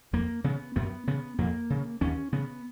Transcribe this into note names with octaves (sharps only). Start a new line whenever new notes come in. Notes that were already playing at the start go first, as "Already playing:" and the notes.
F2 A#3
C#3 B3
F#2 B3
C#3 B3
F2 A#3
C#3
D#2 C#4
C#3 B3